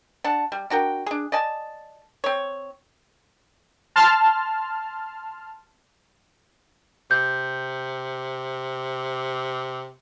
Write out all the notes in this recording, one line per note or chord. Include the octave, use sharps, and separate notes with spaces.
D4 F#5 A5
G3
D4 F#4 A#4 G5
D4 G#4
D5 D#5 G#5 A5
C4 C#5
A5 C6 F6
C3 G6